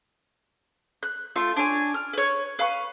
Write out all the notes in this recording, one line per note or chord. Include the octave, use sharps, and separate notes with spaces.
F#6
A3 F4 C6
D4 C#5 G#5
F6
B4 C#5
B4 F5 B5 C#6